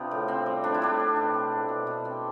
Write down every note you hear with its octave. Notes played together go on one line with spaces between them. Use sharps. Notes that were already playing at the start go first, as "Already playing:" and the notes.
Already playing: C3 B3 D4 F4 G4
A2
C4
G3
A2 D4
E4
A2 D4
C4
B2 D4
C4
A3
B2
B2
C4